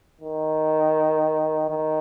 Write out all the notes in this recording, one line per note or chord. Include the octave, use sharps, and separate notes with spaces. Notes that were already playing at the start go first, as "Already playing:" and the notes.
D#3
D#3